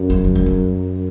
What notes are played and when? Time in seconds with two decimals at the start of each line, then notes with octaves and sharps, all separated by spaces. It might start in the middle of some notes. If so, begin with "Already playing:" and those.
Already playing: F#2
0.10 F#3
0.24 F#3
0.35 G3
0.46 F#3